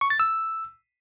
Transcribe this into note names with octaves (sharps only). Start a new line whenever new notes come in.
C#6
A6
E6